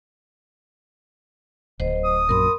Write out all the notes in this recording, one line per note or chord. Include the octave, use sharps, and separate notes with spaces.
D1 F#3 C5 D#5
D#6
A#1 F#2 A#4 B5 C6